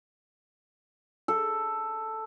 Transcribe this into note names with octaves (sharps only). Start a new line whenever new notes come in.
A4